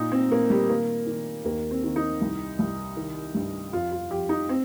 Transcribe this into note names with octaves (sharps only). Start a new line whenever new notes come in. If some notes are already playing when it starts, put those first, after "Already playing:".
Already playing: A#2 D#4
C4
A#2 A#3
G3
D#3 A#3
D#3
D#2 A#3
C4
D#3
D#4
C2
C2
D#3
G2
F2 F4
F4
F2 G4
D#4
C4